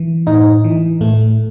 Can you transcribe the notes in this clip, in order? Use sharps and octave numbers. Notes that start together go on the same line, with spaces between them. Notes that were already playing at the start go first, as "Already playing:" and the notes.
Already playing: E3
A2 D#4
E3
A2 A3